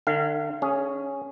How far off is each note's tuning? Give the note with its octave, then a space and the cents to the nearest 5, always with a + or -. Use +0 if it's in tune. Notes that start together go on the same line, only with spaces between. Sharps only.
D3 +40 F5 -35
C#4 +0 G#4 +0